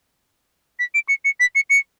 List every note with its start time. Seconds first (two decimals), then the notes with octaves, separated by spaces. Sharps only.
0.79 B6
0.94 D7
1.09 C#7
1.25 C#7
1.40 B6
1.55 C#7
1.70 C#7